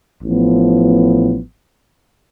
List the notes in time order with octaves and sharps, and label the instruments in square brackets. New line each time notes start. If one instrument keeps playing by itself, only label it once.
[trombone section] A1 A2 F3 B3